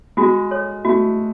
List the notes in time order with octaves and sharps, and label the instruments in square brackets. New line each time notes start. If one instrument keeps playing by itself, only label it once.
[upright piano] G#3 [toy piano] F#4
[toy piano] A4 C#5
[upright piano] A3 [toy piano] F#4